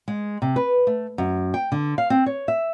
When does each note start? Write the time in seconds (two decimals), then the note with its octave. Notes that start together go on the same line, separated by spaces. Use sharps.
0.08 G#3
0.42 C3
0.56 B4
0.87 A3
1.18 F#2
1.54 G5
1.72 D3
1.98 F5
2.10 C4
2.26 C#5
2.48 E5